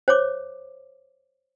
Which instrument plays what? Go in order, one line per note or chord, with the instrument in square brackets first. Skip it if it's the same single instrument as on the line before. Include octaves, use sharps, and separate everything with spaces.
[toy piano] C5 C#5 D6